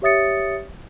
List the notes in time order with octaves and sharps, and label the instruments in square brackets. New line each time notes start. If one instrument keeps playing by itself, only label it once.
[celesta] G4 C#5 E5 D#6 A6 C#7